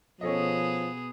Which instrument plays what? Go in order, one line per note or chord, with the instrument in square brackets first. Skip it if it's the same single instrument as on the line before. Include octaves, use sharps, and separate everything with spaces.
[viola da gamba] B2 B3 G#4 [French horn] F3 [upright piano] C#4 A4 D#5